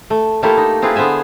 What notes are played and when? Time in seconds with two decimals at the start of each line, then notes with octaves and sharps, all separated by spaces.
0.10 A3
0.43 A3 A#3 E4 F4 G4 A4
0.57 D#4
0.82 C4 E4 F4 G#4 B4
0.96 D3 B3 C5 E5 G#5